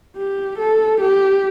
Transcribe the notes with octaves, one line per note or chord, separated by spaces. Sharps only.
G4
A4
G4